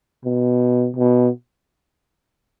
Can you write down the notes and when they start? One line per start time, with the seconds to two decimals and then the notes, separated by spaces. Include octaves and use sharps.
0.25 B2
0.96 B2